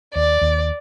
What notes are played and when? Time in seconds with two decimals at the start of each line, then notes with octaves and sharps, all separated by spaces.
0.15 D#2 D5
0.41 D#2